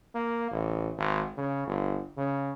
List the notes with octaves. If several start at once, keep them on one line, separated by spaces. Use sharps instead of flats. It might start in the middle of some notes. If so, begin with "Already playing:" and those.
A#3
A1
G#1
C#3
G1
C#3